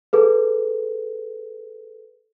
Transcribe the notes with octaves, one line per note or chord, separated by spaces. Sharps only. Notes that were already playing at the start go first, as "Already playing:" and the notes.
G#4 A4 B4